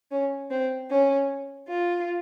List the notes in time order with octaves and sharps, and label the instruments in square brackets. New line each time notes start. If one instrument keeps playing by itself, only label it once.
[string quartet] C#4
C4
C#4
F4